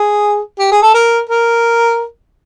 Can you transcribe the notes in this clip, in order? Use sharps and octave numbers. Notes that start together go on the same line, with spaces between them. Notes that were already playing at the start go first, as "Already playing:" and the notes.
Already playing: G#4
G4
G#4
A4
A#4
A#4